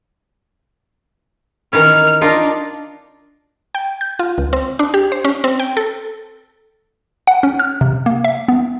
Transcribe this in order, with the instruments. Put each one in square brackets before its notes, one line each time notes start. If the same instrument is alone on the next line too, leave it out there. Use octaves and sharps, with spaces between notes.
[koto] D#3 E3 C#4 [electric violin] F6
[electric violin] D4 [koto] D#4 F4 A#4
[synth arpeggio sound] G5
G6
F4
C#2
C4
D4
G4
C5
C#4
C4
G5
A4
F#5
C#4
F6
C3
A#3
E5
B3